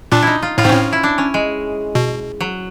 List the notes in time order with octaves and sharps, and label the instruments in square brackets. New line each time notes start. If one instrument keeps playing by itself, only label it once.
[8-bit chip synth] A#2 [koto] D4
[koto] D#4 E4
F4
[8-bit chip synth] A2 [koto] F4
[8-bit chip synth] G#2 [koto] C4
[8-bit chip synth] A2 [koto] C#4
[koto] E4
D4
C#4
G#3
[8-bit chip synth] B2
[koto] F#3